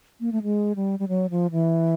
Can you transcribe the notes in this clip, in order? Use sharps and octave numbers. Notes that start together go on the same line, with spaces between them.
A#3
A3
G#3
G3
G3
F#3
F3
E3